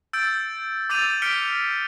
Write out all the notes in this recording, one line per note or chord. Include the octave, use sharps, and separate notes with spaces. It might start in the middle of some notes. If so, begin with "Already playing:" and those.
E6 G6 A6 D7
D6 E6 G6 A6 D#7 F7
F6 G6 B6 C#7 D7 G7